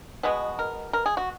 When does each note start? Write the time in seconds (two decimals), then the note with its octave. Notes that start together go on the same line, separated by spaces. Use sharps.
0.23 B2 G#3 B3 F#4
0.59 A#4
0.93 A#4
1.06 G#4
1.17 F#4